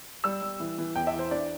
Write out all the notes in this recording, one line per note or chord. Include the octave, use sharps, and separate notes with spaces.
G3 E6
G3
E3
E3
E2 G5
E5
E3
C5
D4 D5